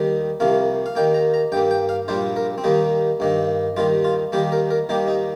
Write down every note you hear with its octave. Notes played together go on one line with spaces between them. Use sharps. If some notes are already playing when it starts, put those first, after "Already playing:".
Already playing: D#2 D#3 G3
C2 C3 F3 A#3 F5
F5
D#2 D#3 A#3 G5
A#5
A#5
G2 G3 A#3 G5
G5
F5
A#1 A#2 G3 A#3 C5
A#4
C4
D#2 D#3 G3 A#3 D#4
G2 D#3 A#3
D#2 D#3 G3 F4
F4
D#2 D#3 G3 A#3 G4
A#4
A#4
D#2 D#3 G3 A#3 G4
D#4